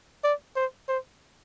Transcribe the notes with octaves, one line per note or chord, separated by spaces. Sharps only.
D5
C5
C5